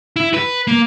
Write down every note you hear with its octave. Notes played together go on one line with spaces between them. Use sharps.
E4
B4
A#3